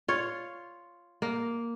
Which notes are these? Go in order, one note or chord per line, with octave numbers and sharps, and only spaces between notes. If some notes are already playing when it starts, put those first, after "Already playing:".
F4 C#5
A#3